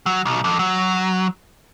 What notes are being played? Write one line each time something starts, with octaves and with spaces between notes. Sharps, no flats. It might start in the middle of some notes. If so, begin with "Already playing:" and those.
F#3
B1
F2
F#3